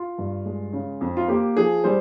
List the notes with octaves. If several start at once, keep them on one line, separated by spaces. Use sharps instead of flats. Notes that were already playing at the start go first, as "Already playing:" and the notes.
Already playing: F4
G2
G#3
C#3
F2
F4
A#3 G4
F3 G#4
G3 C5